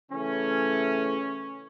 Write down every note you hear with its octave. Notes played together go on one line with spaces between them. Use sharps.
C#3 E3 A3 C#4